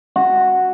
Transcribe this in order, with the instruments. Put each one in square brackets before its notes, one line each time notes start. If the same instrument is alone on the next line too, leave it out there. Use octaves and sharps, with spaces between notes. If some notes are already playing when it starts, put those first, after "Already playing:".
[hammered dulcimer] F#4